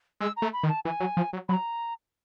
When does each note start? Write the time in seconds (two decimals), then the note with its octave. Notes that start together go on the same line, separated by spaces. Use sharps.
0.21 G#3 E6
0.37 A#5
0.42 A3
0.53 B5
0.63 D#3
0.69 A5
0.85 E3 G#5
1.00 F#3
1.17 F3
1.33 F#3
1.49 F#3 B5
1.53 A#5